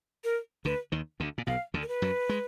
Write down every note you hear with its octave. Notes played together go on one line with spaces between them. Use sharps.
A#4
D2 D3 B4
D#2 D#3
D2 D3
A#2
B1 B2 F5
D2 D3
A#4
B4
F#2 F#3
G#3